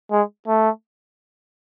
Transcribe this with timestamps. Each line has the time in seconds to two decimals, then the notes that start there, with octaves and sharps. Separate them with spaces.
0.11 G#3
0.48 A3